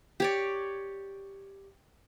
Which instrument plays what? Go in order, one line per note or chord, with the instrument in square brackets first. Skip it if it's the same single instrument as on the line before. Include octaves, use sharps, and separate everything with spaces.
[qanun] G4 C#5 D5